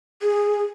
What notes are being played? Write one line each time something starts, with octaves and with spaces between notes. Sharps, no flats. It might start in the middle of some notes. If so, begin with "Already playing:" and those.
G#4